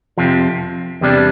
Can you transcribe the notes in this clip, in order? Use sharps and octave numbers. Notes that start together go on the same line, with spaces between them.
F2 C3 F3
E2 C3 G3 D4